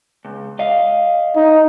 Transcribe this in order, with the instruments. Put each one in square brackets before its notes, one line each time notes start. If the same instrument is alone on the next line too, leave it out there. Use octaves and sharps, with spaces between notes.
[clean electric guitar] C#2
D#5 F5
[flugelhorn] D#4